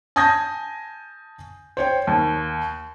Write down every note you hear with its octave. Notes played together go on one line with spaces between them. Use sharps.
G#5 A5 D#6 G6 G#6 A#6
C5 C#5 G5
D#2